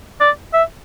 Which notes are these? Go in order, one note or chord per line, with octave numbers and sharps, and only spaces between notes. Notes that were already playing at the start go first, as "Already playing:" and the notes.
D5
E5